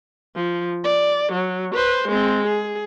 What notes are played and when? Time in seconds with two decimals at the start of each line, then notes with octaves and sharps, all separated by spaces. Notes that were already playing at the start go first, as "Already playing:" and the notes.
0.36 F3
0.84 D5
1.32 F#3
1.75 B4 C5
2.08 G#3 C4
2.47 G#4